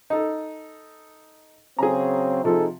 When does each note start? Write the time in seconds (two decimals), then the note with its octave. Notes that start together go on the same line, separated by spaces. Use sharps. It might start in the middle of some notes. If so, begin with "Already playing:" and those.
0.10 D#4 A4
1.79 C#3 F#3 C4 G#4 A#5
2.44 C3 F3 D#4 G#4 A4